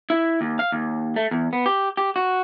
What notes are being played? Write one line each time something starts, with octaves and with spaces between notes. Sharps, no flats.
E4
D#2
F5
D#2
A3
E2
B3
G4
G4
F#4